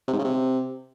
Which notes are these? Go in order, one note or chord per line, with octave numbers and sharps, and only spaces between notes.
C3
G#2
C#3
C3